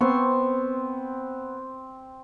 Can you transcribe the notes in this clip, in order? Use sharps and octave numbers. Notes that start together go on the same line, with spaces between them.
B3 C4 C6 C#6